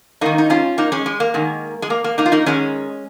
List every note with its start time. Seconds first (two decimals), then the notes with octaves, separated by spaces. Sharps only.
0.21 G#2 D#3 A#3 D#4
0.38 D#4
0.50 C#4 F4
0.78 A#3 D#4
0.92 G#3 C#4
1.06 G#3
1.20 A#3
1.34 G#2 D#3
1.82 G#3
1.90 A#3
2.04 A#3
2.18 A#3 D#4
2.26 F4
2.32 A#3 D#4
2.46 G#2 D#3 G#3 C#4